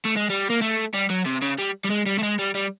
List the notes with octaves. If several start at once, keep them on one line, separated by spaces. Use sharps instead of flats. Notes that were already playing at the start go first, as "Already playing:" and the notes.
A3
G#3
G3
A#3
A3
G3
F#3
C3
C#3
G3
G3
G#3
G3
A3
G#3
G3
G3